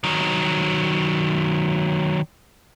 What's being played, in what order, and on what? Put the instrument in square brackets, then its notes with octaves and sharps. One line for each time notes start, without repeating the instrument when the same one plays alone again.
[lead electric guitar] D#3 F#3